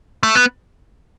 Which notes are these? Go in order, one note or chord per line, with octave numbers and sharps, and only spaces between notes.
A3
B3